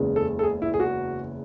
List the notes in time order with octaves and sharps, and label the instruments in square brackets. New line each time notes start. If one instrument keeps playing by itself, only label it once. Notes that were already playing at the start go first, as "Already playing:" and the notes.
Already playing: [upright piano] F#1 E2 C#3 G#3
[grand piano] A4
A4
G#4
E4
G#4
F#4